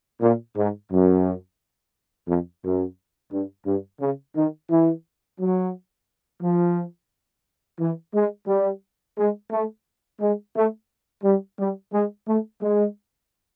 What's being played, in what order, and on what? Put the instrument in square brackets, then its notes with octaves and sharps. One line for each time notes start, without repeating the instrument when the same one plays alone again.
[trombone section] A#2
G#2
F#2
F2
F#2
G2
G2
C#3
D#3
E3
F#3
F3
E3
G#3
G3
G#3
A3
G#3
A3
G3
G3
G#3
A3
G#3